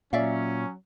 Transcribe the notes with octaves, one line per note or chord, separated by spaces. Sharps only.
A#2 F#3 C#4 D5 E5 F5